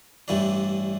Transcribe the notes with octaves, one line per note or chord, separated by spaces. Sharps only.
A1 G2 E3 G3 D4